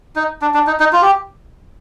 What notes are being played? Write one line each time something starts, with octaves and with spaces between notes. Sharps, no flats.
D#4
D4
D4
D#4
D#4
F4
G4